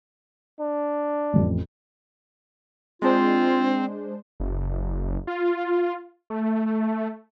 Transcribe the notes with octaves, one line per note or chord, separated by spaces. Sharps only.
D4
A1 F2
G#3 C4 D4 F4 C5
F#1
F4
A3